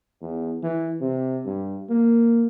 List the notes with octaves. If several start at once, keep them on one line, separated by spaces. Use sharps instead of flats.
E2
E3
C3
G2
A#3